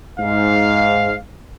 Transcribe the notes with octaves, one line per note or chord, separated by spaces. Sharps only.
G#2 F5